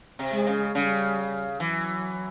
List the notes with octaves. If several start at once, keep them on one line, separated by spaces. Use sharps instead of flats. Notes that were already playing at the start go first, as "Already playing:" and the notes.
C3
G#3
C#3
C#3 G3
E3 F#3